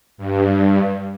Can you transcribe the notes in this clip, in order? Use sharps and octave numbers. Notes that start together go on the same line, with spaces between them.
G2